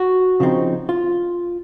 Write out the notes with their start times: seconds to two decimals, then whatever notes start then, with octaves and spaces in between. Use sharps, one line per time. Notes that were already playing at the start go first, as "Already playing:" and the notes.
Already playing: F#4
0.40 C#3 F3 C4 D#4
0.89 F4